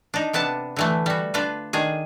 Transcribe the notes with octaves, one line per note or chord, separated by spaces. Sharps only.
D4 D#4
C3 B3 D4 A5
D3 E3 A3
G3 F#4
D4 F4 B4
D#3 D4 G#4